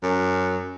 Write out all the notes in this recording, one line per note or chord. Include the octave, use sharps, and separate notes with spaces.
F#2